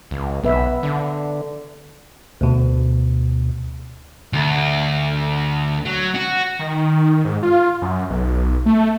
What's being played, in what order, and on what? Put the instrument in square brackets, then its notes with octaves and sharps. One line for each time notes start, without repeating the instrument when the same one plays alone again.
[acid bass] C#2
[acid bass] B1 [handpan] B3 B4 E5
[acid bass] D3
[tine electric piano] D2 B2
[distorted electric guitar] D2
F#3
F#4
[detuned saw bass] D#3
G#2
F4
F#2
B1
A3